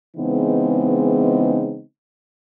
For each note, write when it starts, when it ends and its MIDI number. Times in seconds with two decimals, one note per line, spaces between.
0.17 1.82 49
0.17 1.82 52
0.17 1.82 56
0.17 1.82 59
0.17 1.82 60
0.17 1.82 63